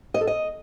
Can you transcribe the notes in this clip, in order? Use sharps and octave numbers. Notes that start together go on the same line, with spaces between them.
D#5
A4
D#5